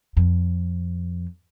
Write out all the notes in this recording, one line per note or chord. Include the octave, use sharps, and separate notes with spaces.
F2